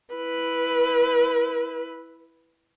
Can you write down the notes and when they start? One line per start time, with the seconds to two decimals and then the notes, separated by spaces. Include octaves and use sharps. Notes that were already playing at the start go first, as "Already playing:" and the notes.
0.15 E4 B4